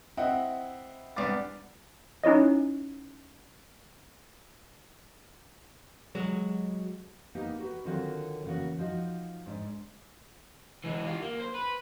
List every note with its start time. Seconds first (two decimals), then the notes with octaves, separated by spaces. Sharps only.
0.17 C4 E4 D#5 F#5
1.16 C2 B3 D4 D6 A6
2.24 C#4 D#4 E4 C#5 D#5
6.15 F#3 G#3 F#4
7.35 A#3 B3 D#4 G4
7.60 F#4 B4
7.85 D3 D#3 F#3 C4 F4 F#4
8.44 C#3 E3 A#3 B3 F#4
8.78 F3 D#4 F#4
9.46 G#2 D4
10.84 E3 G#3
11.06 F4 G4
11.22 A#3
11.40 C5
11.54 B4